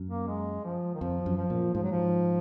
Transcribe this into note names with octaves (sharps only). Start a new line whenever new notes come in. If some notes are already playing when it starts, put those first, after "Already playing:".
Already playing: F#2
A#3
G#3
F3
D#3
F2 F3
F#2
F3
A#2
G#2 F3
F#3
F3